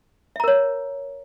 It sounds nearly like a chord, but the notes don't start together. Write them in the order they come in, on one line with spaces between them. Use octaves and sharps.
E5 A#5 A#4 C#5